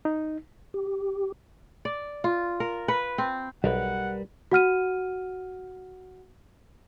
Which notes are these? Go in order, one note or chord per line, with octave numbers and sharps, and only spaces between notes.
D#4
G4
D5
F4
A#4
B4
C4
B1 G3 A#4 B4 F#5
F#4 F#5 F6 D#7